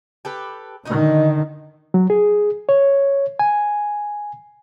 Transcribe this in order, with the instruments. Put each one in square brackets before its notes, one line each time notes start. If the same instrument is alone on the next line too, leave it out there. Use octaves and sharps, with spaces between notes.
[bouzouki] G4 A4 B4
[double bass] D3 D#3 [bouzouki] D#4 F#4 D#5
[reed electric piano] F#3
G#4
C#5
G#5